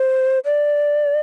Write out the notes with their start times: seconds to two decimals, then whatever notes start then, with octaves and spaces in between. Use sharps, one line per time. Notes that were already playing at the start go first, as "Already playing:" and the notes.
Already playing: C5
0.45 D5